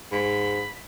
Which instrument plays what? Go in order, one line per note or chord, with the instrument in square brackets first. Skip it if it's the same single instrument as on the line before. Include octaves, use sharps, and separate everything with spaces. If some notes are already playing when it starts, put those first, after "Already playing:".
[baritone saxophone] G#2 [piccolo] B5